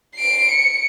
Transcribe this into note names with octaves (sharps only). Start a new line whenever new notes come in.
C7 D7
C#7